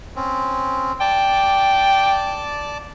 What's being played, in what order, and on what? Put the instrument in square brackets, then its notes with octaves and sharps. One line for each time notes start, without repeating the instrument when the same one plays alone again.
[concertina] C4 C#4
[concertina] D5 A5 D6 [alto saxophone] G5